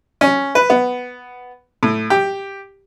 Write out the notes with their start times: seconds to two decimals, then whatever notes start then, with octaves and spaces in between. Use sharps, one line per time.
0.21 C#4
0.55 B4
0.70 B3
1.83 A2
2.10 G4